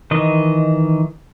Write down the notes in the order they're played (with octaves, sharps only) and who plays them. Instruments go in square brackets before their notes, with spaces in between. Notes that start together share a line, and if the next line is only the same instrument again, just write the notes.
[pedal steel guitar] D#3 E3 D#5